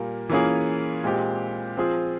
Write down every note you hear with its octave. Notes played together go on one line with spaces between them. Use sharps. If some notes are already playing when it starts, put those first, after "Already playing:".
Already playing: A#2 G3 A#3
E3 A#3 C#4 F4 G#4
A#2 G#3 C4 G4
F3 C4 F4 G#4